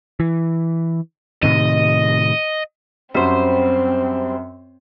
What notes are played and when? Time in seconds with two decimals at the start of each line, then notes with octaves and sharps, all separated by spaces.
0.20 E3
1.43 A2 C3 D#3 D#5
3.14 F#2 G3 C4 F#4 C5